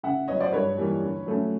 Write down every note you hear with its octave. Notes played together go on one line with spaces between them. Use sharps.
C#3 E5 F#5
F#3 B3 C#5 D#5
C5 D5
G2 B4 C#5
E3 G3 A#3
D3
F#3 A3 C#4